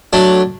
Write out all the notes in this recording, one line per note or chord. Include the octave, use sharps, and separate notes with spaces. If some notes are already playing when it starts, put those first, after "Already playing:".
F#3 A3 D4